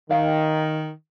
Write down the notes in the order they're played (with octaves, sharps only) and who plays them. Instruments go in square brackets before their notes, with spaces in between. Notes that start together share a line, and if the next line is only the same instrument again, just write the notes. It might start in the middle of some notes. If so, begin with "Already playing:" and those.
[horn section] D#3 [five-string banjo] F5 G5